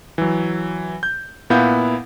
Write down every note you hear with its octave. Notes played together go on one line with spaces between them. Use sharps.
E3 F#3
G6
A#2 B3 E4 F5 F#5 G6